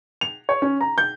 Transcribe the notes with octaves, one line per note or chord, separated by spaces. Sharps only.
F7
C#5
C#4
A#5
G6